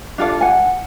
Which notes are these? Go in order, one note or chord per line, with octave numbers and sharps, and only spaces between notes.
D4 F4 A4 D5
F#5 G#5